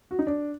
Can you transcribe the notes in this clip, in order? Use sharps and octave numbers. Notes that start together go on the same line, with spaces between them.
F#4
D#4
D4